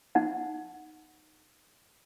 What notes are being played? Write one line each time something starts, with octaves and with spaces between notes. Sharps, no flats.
D#4 F#5